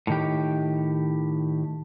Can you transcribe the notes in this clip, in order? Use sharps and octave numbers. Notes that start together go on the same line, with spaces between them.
A2 D#3 G4